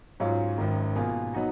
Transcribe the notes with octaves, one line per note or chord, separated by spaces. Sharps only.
G#2 F#3 C#4 F4
G#1 F#2 D#3
B2 A#3 F4 G#4
F#3 B3 D#4 F#4